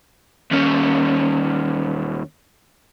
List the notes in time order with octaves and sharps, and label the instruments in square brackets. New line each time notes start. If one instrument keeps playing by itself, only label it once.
[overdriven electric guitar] D#2 C#4